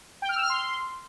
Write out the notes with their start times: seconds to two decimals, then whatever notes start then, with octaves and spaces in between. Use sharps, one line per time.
0.22 G5
0.29 F6
0.36 E6
0.43 F6
0.50 C6